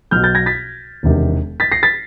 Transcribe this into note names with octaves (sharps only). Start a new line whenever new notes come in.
B1 B2 F6 G6
G6 A6
G#6 A#6
A6 B6
E1 E2 C3 D#3
A6 B6
A#6 C7
A6 B6